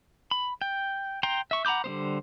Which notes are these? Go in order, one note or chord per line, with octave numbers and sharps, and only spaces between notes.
B5
G5
G5 A#5 C6
E5 C#6
F#5 A#5 B5 D6 G6
D3 G3 B3 C5